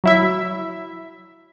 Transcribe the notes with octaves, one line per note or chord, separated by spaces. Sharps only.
F#3 E4 E5